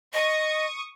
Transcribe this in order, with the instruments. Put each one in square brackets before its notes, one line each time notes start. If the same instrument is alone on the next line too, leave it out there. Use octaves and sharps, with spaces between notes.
[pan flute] D#5 [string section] C#6 D#6